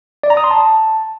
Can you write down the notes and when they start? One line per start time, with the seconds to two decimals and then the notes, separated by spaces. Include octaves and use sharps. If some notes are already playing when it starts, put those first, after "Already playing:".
0.23 D5
0.30 A#5
0.37 D#6
0.44 C6
0.51 A5